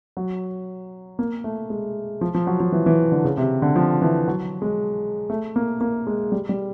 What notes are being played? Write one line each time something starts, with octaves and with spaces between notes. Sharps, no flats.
F#3
A#3
A3
G#3
F3
F3
F#3
F3
E3
E3
D3
C#3
C3
D3
F3
E3
F#3
G#3
A3
A#3
A#3
G#3
G3
G3